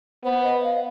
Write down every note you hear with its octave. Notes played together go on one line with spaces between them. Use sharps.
B3 C5
D#5
D#5
F5